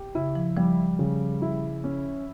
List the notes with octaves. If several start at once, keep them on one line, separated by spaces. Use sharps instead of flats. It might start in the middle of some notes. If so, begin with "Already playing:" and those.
Already playing: G4
C#3 E4
F3
F3 G3
C#3
E4
C#4